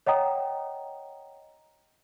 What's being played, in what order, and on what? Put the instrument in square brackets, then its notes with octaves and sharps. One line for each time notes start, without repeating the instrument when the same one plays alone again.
[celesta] C#5 D#5 F#5 G5 A#5 D#6